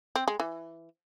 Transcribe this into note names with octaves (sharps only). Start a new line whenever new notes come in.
C4
G#3
E3